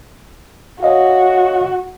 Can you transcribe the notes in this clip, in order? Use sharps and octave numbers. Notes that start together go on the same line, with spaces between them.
F#4 C#5 D#5 F5